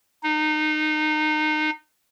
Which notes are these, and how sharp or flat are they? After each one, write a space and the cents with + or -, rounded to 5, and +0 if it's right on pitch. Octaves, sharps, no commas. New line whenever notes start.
D#4 -25